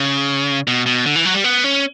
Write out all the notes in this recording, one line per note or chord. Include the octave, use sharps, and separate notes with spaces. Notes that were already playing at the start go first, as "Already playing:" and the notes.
Already playing: C#3
B2
B2
D3
E3
F#3
G3
B3
C#4